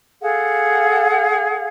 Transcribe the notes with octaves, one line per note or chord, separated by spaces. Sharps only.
G#4 A4 F5 F#5